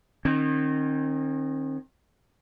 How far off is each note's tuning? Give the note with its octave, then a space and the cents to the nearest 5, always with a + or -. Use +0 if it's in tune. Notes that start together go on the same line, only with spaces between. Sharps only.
D#3 -20 C4 +40